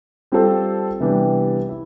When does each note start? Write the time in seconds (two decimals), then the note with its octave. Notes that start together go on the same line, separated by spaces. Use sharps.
0.32 G3 C4 F4 A4 C5
1.00 C3 E3 G3 B3 D4
1.69 E4